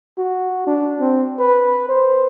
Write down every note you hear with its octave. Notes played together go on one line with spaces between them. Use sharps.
F#4
D4
C4
B4
C5